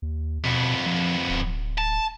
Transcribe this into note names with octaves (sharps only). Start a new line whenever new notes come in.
D#2
F2 B2 B3
F3
D1
A5